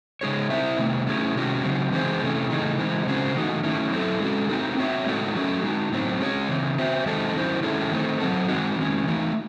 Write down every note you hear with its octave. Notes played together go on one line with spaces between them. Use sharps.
C#3 G#3 D#4 G#4 C#5
C4 E4 C5 E5
C3 D#3 A3
A3 C#4 E4 G#4
C3 D#3 G#3 C#4 F#4
C#3 F#3 C4
E3 G#3 D#4 G#4 C5
C3 E3 A3 C#4
C#3 E3 A3 D#4 G#4
E3 G#3 C4 D#4
C#3 G#3 C#4 F#4 C5
E3 A3 D#4 F#4
D#3 A3 C#4 E4
F#3 C4 E4 A4
G#3 C#4 F#4 A4
A3 C4 D#4 F#4 A4
C4 F#4 C#5 E5
A2 G#3 D#4 F#4 A4
F#3 A3 C#4 F#4
G#3 D#4 F#4
A2 F#3 C4 D#4
G#3 C#4 G#4 C#5
C#3 E3 C4
C4 F#4 C5 E5
D#3 G#3 C4 D#4 A4
D#3 F#3 C#4 E4 C5
D#3 G#3 C#4 E4 A4
D#3 A3 C4
F#3 C4 D#4 A4
D#3 G#3 C4 D#4 F#4
D#3 G#3 C#4
E3 A3 D#4